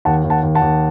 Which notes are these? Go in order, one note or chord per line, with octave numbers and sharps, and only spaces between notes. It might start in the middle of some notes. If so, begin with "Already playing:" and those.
D#2 F#5 A5
D#2
F#5 A5
D#2
F#5 A5
D#2